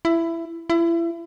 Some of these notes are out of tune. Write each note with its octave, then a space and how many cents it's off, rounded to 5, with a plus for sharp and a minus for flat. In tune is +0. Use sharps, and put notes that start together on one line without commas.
E4 +15
E4 +30